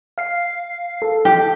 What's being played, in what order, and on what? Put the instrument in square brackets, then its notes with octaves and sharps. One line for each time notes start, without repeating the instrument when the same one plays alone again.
[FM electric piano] F5 C7
A4
[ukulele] G4